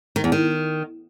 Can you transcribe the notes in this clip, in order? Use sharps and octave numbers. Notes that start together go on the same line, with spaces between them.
D#3
E2
D#3